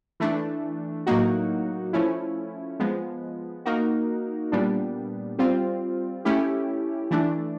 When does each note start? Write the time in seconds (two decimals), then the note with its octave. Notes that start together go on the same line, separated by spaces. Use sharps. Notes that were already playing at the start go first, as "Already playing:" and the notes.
0.20 E3 A3 D4
1.06 A2 F#3 A#3 D#4 F#4
1.93 F3 A3 C#4 E4
2.80 F3 G#3 B3
3.65 A#3 D#4 F#4 A#4
4.52 A#2 G3 B3 D4
5.38 G3 C4 F4
6.25 A3 C#4 E4 G4
7.11 E3 A3 D4